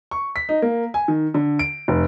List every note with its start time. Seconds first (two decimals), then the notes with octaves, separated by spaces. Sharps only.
0.11 C#6
0.36 B6
0.49 D#4
0.62 A#3
0.94 G#5
1.08 D#3
1.34 D3
1.59 D7
1.88 F1